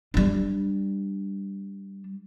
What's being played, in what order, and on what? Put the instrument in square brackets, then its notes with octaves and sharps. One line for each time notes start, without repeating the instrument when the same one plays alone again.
[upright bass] G3 D4